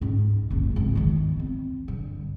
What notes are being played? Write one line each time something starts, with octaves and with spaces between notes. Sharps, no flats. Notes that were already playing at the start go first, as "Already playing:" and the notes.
G#2 C#4
F#1 C#2
G#1 F2
E2 D#3
C4
G2 D3